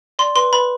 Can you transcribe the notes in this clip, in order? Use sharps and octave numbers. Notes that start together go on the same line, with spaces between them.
D5 C6
B4 C6
B4 B5